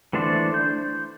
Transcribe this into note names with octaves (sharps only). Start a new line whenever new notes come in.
E3 A3 D4 C5 D5
G6